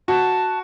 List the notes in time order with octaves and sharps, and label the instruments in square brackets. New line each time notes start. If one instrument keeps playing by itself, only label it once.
[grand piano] F#4 [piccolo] A5